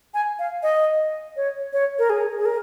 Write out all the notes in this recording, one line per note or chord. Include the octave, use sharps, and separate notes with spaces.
G#5
F5
D#5
C#5
C#5
A#4
G#4
G#4
A#4